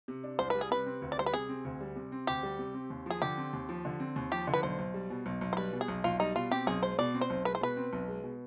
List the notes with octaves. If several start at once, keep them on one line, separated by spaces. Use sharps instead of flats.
C3
D4
C2 C5
G3 B4
G#4
C3 B4
C4
D2
D5
G3 C5
B4
C3 G#4
C4
D2
G3
C3
C4
D2 G4
G3
C3
C4
D#2
F3 G#4
D3 G4
C4
D#2
F3
D3
C4
D#2
F3 G4
D3
B4
B1 C5
B1
G3
B2
B1
B1
C5
G3 B4
B2
G#4
B1
B1 F4
G3 D#4
B2 F4
C4 G4
B1 G#4
G#3 C5
B2 D5
C4
C5
B1
G#3 B4
C5
B2 B4
C4
B1
G#3
B2